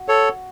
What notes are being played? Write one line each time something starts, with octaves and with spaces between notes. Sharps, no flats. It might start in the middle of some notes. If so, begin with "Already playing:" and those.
Already playing: F#4
A4 C#5